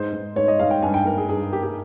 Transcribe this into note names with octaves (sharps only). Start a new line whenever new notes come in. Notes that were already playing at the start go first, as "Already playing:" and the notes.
Already playing: G#2 C5
G#2
G#2 C#5
D#5
G#2 F5
G5
G2 G#5
G5
A#3 A#4
G#4
G2 G#4
A#3 G4
G4